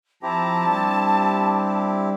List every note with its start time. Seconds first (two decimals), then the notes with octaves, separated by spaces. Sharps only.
0.23 F3 C4 E4 G4 A5 A#5
0.65 G3 D4